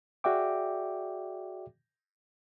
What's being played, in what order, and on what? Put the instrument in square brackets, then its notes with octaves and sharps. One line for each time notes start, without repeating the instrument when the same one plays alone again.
[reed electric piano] F#4 G#4 D5 E5 G5 D6